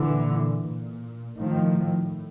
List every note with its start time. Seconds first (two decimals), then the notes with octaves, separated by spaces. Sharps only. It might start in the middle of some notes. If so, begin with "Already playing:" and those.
Already playing: A#2 D3 E3
0.63 A#2
1.39 A2 D#3 F3